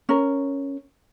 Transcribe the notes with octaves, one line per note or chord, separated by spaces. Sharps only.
C#4 A#4